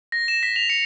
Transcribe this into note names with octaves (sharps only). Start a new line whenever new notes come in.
A#6
E7
B6
F7
C#7